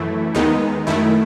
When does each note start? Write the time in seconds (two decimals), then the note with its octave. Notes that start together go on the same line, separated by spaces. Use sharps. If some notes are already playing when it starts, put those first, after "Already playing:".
Already playing: F#2 E3 A3 E4
0.35 D#2 D#3 G#3 B3 D#4
0.87 F#2 D#3 A3 E4